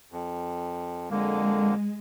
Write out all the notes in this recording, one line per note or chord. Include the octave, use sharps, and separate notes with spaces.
F2
F2 D3 G#3 A#3